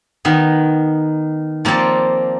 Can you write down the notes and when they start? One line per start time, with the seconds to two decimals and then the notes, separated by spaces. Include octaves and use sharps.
0.25 D#3 B3
1.65 F3 A#3 C4 C#5 D5